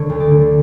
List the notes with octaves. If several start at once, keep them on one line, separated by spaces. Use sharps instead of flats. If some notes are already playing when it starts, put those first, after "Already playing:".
Already playing: D3 C#5
D2
D5
D3